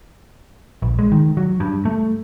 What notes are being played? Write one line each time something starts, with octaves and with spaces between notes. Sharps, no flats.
A#1
G#3
D#3
F#3
G2
A3